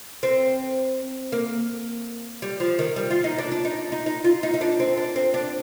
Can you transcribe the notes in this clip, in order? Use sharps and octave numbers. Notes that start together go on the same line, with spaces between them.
C4
A#3
G3
F3
D#3
G3
F4
D#4
D4
D4
D#4
D#4
D#4
F4
D#4
D#4
D4
C4
D4
C4
D4